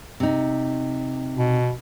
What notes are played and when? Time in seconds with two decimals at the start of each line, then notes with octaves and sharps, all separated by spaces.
0.20 C3 D#4
1.37 B2